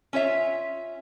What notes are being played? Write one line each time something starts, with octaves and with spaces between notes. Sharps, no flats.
C#4 F4 C#5 E5